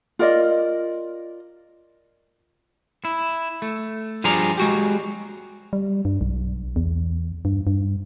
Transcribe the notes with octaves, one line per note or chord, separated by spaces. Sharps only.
F4 A#4 D5 D#5
E4
A3
G2 F3 G#4 D5 A#5
G#3 F#4 G4
G3
G2
B1
E2
G2
G2